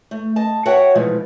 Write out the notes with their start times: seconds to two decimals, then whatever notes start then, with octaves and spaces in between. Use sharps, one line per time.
0.11 A3
0.36 D#5 A5
0.66 F#4 C#5 E5 F#5 G5
0.95 B2 E3 F3 G#3 A3 D#4